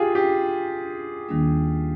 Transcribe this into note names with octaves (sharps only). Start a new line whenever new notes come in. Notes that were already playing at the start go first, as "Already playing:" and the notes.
Already playing: F4 G4 G#4
G4
D#2 D#3 G3 A#3 D4